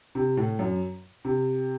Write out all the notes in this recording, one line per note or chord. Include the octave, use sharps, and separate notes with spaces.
C3
A2
F#2
C3